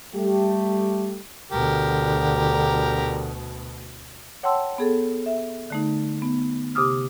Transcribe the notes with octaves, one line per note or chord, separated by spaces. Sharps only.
G3 A3 G4
D2 B2 D3 G4 A#4
C#5 F#5 G5 A5 C6 E6
B3 G#4 A4
E5
D3 A3 D#4
B3
C3 G4 D6 D#6 F6